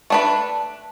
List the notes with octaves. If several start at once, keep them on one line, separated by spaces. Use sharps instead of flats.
A3 D4 B4